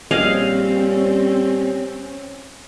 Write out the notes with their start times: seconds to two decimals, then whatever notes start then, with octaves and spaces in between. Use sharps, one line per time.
0.11 A#1 G3 C4 C#4 G#4 D#5 F5